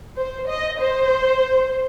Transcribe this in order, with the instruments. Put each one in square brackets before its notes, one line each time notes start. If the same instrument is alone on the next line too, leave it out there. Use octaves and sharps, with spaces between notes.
[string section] C5
D#5
C5